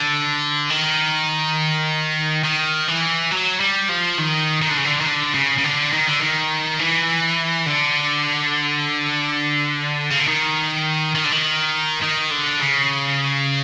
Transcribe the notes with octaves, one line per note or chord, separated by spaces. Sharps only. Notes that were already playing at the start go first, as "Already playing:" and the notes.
Already playing: D3
D#3
D#3
E3
F#3
G3
F3
D#3
D#3
D3
C#3
D3
D#3
D3
C#3
C#3
D3
D#3
D3
D#3
E3
D3
C#3
D3
D#3
D#3
D3
D#3
D#3
D3
C#3